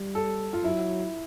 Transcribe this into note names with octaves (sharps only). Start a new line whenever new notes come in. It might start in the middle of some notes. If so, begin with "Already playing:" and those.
Already playing: G3
A4
F4
F#3 E4